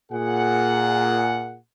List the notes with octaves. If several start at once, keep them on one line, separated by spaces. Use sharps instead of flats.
A#2 G#4 F#5